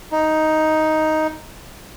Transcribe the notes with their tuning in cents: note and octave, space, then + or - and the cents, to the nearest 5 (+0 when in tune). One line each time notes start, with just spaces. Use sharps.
D#4 +5